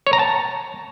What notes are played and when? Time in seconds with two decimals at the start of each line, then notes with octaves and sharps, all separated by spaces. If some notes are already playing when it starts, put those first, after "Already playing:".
0.07 C#5
0.13 A#5
0.19 A5